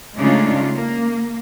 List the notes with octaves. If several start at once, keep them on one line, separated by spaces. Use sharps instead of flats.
C#3 G#3 A3 D4 D#4 F4
A#3